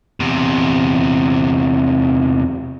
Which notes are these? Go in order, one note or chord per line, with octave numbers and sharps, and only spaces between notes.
E2 C3